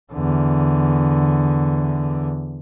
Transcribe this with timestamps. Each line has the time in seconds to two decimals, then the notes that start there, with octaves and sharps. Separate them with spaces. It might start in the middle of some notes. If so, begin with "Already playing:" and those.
0.13 E2 D3